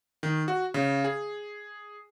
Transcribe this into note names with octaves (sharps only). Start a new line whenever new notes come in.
D#3
F#4
C#3
G#4